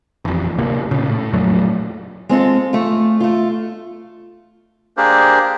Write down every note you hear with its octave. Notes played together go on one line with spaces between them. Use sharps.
A1 F2
D2 C3 A#3
A#2 C#3
A2
F2 A#2 F#3 A3
G#3 C4 F4 A4
A3 F4
A3 F4
A#3 D4 G4 G#4 A#4 C5